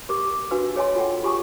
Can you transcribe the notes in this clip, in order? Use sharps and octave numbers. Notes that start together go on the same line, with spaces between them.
G4 A#4 D6
D4 F#4 B4 F5 E6
G#4 C#5 D#5 F5 G#5 C6
F4 A4 F#5 G5
F4 G4 G#4 G#5 C#6 D#6